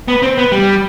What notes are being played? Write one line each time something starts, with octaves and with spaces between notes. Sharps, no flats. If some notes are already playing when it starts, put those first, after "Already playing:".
B3
C4
B3
G3